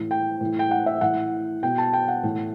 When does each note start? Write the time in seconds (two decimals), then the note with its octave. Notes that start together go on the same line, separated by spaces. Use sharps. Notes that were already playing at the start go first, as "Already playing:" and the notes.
Already playing: A2 E3
0.11 G5
0.41 A2 E3
0.59 G5
0.71 F#5
0.86 E5
1.01 A2 E3 F#5
1.63 B2 G5
1.78 A5
1.93 G5
2.08 F#5
2.23 A2 E3